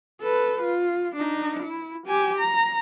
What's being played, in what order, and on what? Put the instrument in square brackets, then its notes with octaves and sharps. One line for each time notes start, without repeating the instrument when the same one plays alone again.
[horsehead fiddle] A4 B4
F4
D4 D#4
E4
G4 G#5
A#5